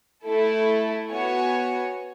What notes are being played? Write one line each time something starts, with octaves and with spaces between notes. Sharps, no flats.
A3 E4 A4
B3 F#4 C#5 G#5